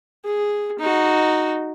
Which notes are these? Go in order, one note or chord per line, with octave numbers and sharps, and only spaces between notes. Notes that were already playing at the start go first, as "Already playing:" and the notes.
G#4
D#4 F#4